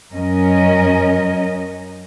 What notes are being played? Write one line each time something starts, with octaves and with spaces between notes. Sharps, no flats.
F#2 F#3 C#4 A#4 D#5